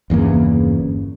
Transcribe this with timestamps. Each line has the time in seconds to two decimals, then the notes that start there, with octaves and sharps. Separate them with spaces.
0.10 G1 E2 C#3 A#3